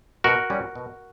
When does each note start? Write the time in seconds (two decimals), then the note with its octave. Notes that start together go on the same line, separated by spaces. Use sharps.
0.24 B2 F#4 A#4
0.50 G3 C#4
0.75 B2